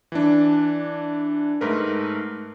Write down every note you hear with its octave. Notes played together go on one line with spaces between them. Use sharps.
E3 D4
G#2 A3 A#4 B4